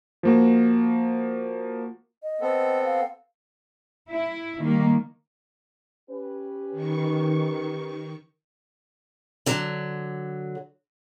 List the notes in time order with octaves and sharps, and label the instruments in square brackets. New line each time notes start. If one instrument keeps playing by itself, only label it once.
[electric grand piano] F3 A#3 F#4
[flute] D#5
[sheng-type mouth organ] B3 C4 A4
[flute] F5
[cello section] E4
D#3 G3 A#3
[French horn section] C#4 G4 B4
[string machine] D#3 C#6
[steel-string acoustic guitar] D3 F#3